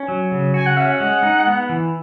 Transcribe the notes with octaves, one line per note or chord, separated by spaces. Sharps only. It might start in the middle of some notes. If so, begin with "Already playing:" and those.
Already playing: C#4
F#3
C#3
F#4 G#5
F#5
C#4 E5
F#5
G#3
D#4
B3
E3